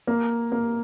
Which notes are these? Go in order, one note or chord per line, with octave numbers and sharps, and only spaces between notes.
A#3
A#3